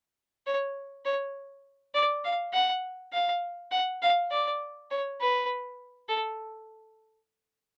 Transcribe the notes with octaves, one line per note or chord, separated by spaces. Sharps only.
C#5
C#5
D5
F5
F#5
F5
F#5
F5
D5
C#5
B4
A4